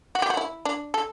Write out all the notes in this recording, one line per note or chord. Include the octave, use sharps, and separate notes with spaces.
F#4
G4
F#4
E4
D4
A4